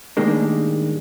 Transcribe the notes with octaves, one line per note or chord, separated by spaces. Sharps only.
A2 D#3 G3 G#3 A#3 D4